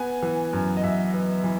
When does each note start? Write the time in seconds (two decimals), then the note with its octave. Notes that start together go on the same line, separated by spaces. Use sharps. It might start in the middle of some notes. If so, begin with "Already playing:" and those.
Already playing: B3 G#5
0.23 E3
0.53 F#2
0.77 D#5
0.83 F#2 E5
1.14 B3
1.44 E3